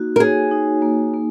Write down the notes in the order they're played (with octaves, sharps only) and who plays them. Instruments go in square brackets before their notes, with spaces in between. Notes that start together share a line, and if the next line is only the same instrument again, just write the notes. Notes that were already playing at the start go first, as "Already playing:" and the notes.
Already playing: [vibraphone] A#3 D#4 F#4
[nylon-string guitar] A#4
[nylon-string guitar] G#4 [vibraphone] C#5
[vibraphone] D#4
A#3
A#3